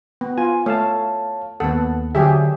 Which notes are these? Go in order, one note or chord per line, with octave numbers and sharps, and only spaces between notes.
B3
F4 G#5
A3 C#5 F5 A5
D#2 B3 A4 F#5
D3 F#3 G4 G#4 E5